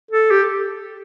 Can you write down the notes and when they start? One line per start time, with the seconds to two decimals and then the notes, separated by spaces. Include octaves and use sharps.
0.11 A4
0.31 G4